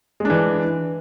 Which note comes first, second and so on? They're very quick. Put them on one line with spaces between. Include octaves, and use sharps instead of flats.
G#3 D4 E3